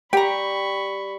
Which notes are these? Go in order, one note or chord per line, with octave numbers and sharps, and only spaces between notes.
G3 G4 G5 A#5 B5 C#6